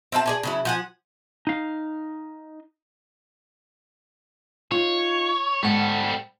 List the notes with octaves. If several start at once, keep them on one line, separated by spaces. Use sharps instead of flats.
C4 E5 F5 A5
G#4 D5 G#5
C#3 F#3 E4
F3 F#5 G#5
D#4 F5
D#4 F4 C#5
G#2 G3 A4 F#5